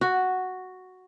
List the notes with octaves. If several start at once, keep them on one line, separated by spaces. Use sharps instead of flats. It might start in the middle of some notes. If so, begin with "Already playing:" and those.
F#4